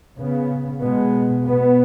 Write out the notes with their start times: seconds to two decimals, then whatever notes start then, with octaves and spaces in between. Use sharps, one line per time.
0.17 C#3 B3
0.81 B2 G#3 B3
1.46 B2 B3